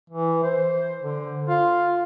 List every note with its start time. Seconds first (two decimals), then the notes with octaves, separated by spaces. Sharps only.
0.10 E3
0.43 C5
1.02 D3
1.49 F4